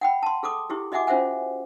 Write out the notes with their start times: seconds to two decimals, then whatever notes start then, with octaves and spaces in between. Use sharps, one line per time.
0.01 F#5 G5 B5
0.23 A5 C6
0.43 G#4 A4 D6 D#6
0.70 E4 G4 G#4
0.92 F#4 D#5 E5 F#5 G#5 D6
1.07 C#4 F4 C5 E5 F#5 G#5